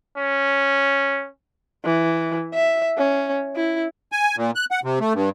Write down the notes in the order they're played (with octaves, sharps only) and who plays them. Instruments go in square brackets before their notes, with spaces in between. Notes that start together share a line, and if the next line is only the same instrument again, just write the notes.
[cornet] C#4
[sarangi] E3
E5
C#4
E4
[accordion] G#5
A#2
F#6
F#5
C3
A3
G2